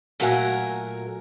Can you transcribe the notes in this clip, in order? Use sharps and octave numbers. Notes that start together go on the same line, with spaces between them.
A#2 F#3 A3 A#4 F#5 G#5